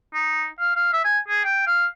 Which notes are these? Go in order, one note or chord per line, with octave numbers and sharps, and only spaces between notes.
D#4
F5
F5
E5
G#5
G#4
G5
F5